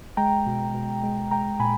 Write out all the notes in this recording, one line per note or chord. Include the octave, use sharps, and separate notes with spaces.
G#3 G5 A#5
B2
B2
G#3
G#3 G5 A#5
A#2 G#5 B5